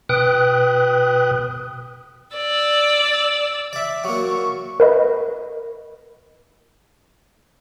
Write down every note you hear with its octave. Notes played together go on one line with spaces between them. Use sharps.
B2 B4 G5 D#6 F#6
D5 E6
D5 E5
F#3 A#3 C#6
A#4 B4 D#5